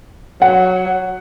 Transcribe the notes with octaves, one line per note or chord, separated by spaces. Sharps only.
F#3 F#5